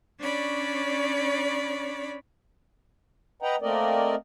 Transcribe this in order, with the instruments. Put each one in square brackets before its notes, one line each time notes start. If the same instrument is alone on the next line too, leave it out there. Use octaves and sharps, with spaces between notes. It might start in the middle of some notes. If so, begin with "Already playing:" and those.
[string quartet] C#4 D4 C#5 D5 B5
[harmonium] B4 D#5 F#5 G5 A#5
A3 A#3 C4 A#4 D5 D#5